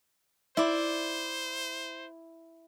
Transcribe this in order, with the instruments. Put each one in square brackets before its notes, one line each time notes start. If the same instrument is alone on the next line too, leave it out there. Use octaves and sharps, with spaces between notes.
[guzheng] E4 D5 [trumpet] C5